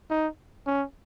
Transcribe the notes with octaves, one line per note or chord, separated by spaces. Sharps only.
D#4
C#4